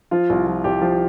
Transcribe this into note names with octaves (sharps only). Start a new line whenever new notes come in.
F3 F4
C2
F3
C2 G4
F3